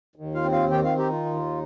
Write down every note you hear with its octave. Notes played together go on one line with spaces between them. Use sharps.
D#2
F4 F5
C4
F4 F5
D#3 G4 G5
F4 F5
D#4 G4
F4
D#2